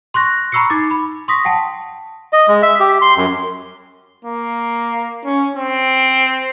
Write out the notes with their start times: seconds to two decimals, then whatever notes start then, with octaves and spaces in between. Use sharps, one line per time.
0.14 C6 C#6 F#6 A#6
0.52 A#5 B5 C#6 E6 C7 C#7
0.70 D#4 D6 A6
0.91 B5
1.28 C6 C#6 D#6 A#6 B6
1.45 F#5 G5 A5
2.33 D#5
2.48 G#3
2.62 E5
2.80 G4
3.02 C6
3.17 F#2
4.25 A#3
5.25 C#4
5.57 C4